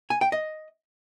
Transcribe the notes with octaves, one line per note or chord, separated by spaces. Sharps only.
G#5
G5
D#5